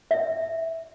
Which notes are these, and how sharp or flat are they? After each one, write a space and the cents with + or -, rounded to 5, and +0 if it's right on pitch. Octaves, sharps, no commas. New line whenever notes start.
E5 -10